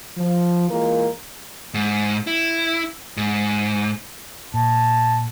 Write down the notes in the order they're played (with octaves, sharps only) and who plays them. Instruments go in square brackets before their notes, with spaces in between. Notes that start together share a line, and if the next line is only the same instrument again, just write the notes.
[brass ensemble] F3
E3 G#3 A#3 F4 A#4
[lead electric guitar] G#2
E4
G#2
[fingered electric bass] A#2 [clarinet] A5